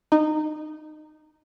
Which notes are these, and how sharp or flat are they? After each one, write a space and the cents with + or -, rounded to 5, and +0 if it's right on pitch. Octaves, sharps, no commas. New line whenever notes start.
D#4 -20